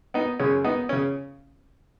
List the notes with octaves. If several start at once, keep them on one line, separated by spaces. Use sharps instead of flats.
B3 D#4
F#2 C#3 G#3 C#4
B3 D#4
C#4
C#3